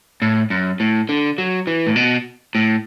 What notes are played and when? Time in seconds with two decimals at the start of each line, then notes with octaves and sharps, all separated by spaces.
0.22 A2
0.50 F#2
0.80 A2
1.09 D3
1.38 F#3
1.67 E3
1.87 A2
1.96 B2
2.55 A2